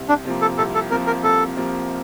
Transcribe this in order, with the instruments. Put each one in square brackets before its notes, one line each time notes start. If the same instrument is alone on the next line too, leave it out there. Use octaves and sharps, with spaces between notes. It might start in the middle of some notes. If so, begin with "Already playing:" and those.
Already playing: [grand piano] C2
[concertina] D4
[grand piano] C3 F3 A#3
[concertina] A4
[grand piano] C2 [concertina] A4
[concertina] A4
[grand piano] C3 F3 A#3 [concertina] A#4
[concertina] A#4
[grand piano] C2 [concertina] A4
[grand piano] C3 F3 A#3